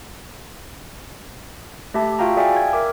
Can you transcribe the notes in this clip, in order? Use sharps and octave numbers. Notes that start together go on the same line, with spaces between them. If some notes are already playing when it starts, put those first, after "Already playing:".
A3 G4 E5 A5
F4 F#4 E5 F5 G5 A#5
G#4 D5 E5 F5 G5 G#5
G#6
A#4 E5 D6